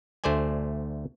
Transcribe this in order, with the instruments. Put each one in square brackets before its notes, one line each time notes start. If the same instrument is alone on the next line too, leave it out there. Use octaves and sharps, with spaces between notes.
[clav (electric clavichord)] D2 A3 C5 D5 G#5